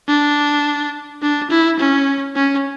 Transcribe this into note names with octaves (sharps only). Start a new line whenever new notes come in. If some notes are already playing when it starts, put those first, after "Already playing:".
D4
D4
E4
C#4
C#4